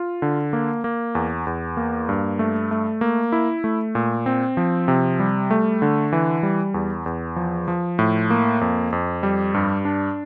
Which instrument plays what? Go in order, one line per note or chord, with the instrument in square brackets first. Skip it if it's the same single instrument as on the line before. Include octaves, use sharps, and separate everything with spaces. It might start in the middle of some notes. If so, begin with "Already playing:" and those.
Already playing: [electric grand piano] F4
D3
A#3
A#3
E2
E2
A#3
G2
A3
A3
A#3
E4
A3
A#2
C4
F3
C3
G3
A3
D3
E3
G3
E2
E2
F3
F3
A2
A#3
F2
F2
G3
G2
D4